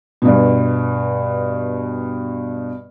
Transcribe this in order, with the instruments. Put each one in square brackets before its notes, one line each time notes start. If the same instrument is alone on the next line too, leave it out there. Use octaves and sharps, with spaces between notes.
[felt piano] G2 B2